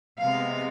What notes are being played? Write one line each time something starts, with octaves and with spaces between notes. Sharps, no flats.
C3 G#3 B3 F5